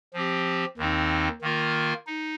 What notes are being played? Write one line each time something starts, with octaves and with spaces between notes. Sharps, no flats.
F3 C4 G4
D#2 D#3 C4 D#4
D#3 A#3 F4 A#4
D#4